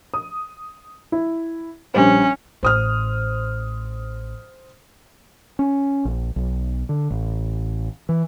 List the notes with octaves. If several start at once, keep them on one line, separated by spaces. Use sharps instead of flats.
D#6
E4
A#1 G3 C#4 C5
A1 C5 D#6 F6
C#4
A#1
B1
D3
A1
E3